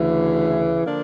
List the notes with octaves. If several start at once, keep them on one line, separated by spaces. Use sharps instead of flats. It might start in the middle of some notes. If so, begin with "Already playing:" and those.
Already playing: D2 C#3 E3
D3 F3 A#3 D4